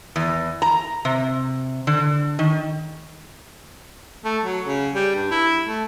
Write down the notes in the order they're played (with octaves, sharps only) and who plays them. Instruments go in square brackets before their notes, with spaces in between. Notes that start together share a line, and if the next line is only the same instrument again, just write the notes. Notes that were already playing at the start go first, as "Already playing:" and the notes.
[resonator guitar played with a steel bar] E2
A#5
C3
D3
D#3
[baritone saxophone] A3
F#3
C#3
G3
G2
E4
A3